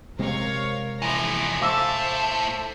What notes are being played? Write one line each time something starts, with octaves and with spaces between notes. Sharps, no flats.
C3 G#3 C4 A#4 C#5 F5
E3 F3 E4 A#5 D6
A2 A4 C5 E5 F5 A5 D6 E6